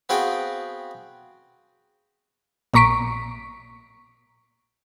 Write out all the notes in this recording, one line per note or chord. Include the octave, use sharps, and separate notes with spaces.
B3 C4 F#4 G#4 F5 G5
A#1 A#2 A#5 C#6 B6 D7